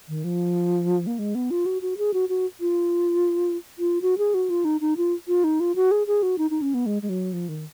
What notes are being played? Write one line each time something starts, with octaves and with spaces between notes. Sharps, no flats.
D#3
F3
A#3
G#3
B3
F4
F#4
F#4
G#4
F#4
F#4
F4
F4
F#4
G#4
F#4
F4
D#4
D#4
F4
F4
D#4
F4
F#4
G#4
G#4
F#4
D#4
D#4
C#4
B3
G#3
G#3
F#3
F3
D#3